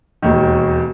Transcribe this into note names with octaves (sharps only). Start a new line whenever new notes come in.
E1 D#2 D#3